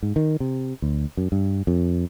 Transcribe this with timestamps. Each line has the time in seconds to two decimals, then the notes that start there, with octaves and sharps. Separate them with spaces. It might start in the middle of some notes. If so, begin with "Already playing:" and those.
0.03 G#2
0.16 D#3
0.40 C3
0.82 D2
1.17 F#2
1.32 G2
1.67 F2